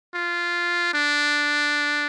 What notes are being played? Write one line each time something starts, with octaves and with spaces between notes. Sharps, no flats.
F4
D4